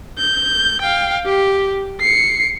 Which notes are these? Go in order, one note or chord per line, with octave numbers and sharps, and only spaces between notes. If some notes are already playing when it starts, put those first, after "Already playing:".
G6
F5 G5
G4
C7 C#7